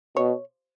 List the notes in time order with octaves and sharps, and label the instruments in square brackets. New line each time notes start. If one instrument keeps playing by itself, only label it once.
[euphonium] B2 [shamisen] C#5